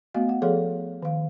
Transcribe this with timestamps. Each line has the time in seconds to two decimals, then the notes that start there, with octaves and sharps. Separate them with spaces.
0.14 A3 B3 F#4 D#5 F5
0.29 F#5
0.42 F3 G#4 A4 C#5 F5 C6
1.03 D#3 F5